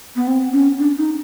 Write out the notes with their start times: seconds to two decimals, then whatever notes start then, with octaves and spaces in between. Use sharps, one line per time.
0.16 B3
0.28 C4
0.53 C#4
0.79 D4
0.98 D#4